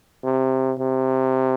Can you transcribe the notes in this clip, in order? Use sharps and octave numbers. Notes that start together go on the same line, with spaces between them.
C3
C3